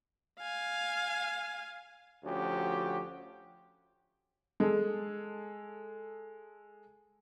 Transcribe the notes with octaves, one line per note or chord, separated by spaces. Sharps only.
F5 G#5
D2 F3 C#4 F#4 G4
G#3 G#4 A4